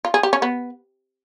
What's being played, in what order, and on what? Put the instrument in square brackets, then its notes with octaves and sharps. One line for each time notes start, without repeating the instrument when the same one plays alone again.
[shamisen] F4
G#4
G4
C#4
B3